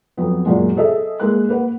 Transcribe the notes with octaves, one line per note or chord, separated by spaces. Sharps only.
F2 F#3 B3
F#2 A#2 F#3 G#3
G#4 A4 D#5 E5
G#3 A#3 F#6
A#3 B4 F#5